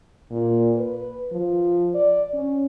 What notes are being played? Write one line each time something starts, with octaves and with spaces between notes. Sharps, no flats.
A#2
B4
F3
D5
C#4